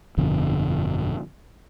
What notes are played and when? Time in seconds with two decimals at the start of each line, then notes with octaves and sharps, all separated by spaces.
0.17 G1 F2 B2 D3